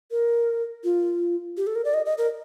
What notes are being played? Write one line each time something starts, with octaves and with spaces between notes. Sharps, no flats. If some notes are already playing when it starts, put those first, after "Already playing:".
A#4
F4
G4
A4
A#4
D5
D#5
D#5
A#4